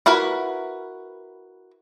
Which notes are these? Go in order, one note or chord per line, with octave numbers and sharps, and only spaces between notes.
E4 F#4 A#4 B4